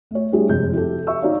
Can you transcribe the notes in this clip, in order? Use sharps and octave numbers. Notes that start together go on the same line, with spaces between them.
A3 C#5
G3 A3 D4 E4 G4 G#4
F1 C3 G#3 G6
E4 F#4 G4 A4
E5 C#6 E6
D#4 C#5 D5 F5